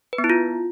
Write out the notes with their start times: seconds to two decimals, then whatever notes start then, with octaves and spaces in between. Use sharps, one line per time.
0.13 B4
0.18 B3
0.24 E4
0.30 F4